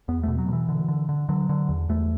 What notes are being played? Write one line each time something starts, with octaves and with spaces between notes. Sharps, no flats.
E2 B3
B2 A3
F#3
B2 E3
D3
D3
D3
D3 F#3
D3
E2
E2 A3